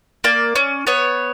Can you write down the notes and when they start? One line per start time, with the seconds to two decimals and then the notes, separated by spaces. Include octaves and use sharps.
0.24 A#3 D5
0.56 C#4
0.87 B3 C#5